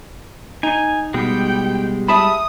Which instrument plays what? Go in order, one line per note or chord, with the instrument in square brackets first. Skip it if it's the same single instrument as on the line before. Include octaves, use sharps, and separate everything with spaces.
[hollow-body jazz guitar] D#4 [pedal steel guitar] G#5
[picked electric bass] B2 [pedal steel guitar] G3 G#3 [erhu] G5
[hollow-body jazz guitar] E5 A5 B5 [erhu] D#6